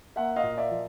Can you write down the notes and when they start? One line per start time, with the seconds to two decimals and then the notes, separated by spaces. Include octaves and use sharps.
0.16 A#3 E5 F#5
0.36 D#5 F5
0.43 A#2
0.57 D5 E5
0.71 F3